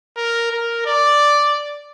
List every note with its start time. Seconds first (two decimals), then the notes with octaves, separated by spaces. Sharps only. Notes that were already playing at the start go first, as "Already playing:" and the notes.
0.16 A#4
0.51 A#4
0.86 D5